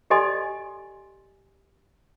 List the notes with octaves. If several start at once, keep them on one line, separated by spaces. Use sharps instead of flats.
G4 A4 D5 D#5 G#5 C6